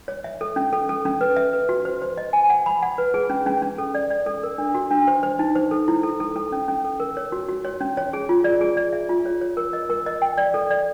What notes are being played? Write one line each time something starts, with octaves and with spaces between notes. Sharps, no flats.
C#5
E5
A4
C#4
A4
A4
C#4
B4
E5
B4
F#4
C5
C5
D#5
G#5
F#5
B5
F#5
B4
G#4
C#4
C#4
C#4
A4
D5
D5
A4
A#4
D4
F#4
D4
C5
C5
D#4
C5
A4
E4
A4
A4
A4
C#4
C#4
A4
A#4
C#5
F#4
F#4
C#5
C#4
C#5
G#4
F4
D5
G#4
D5
E5
F4
C#5
C#5
A#4
D#5
A#4
D#5
G5
D5
A4
D5